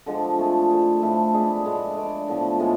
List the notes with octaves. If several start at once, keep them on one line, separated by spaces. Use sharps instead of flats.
D3 F3 G#3 D4
A3 C4 F4 G#4
A3 E4 G#4 C5
A2 F3 A3 E4
G#3 D4 G#4 B4
A2 G#3 D4
A3 D4 A4 D5
A2 F3 B3
A2 G#3 D4 G#4